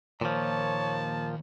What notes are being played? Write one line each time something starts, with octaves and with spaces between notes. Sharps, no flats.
D#2 A#2 F3 C#5 A5